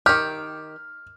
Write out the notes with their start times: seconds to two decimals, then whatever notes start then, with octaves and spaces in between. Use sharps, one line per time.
0.06 D#3 G4 F6